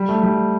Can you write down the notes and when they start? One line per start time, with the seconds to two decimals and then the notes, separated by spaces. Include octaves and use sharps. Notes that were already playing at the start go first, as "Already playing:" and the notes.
Already playing: G3
0.09 A3
0.23 G3